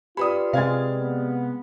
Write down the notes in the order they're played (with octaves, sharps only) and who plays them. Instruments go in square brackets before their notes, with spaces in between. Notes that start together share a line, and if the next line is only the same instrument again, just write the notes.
[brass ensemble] F4 [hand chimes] G4 B4 D5 [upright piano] B5 D#6
[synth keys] C3 G#3 [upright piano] F5 G#6 A6
[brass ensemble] B3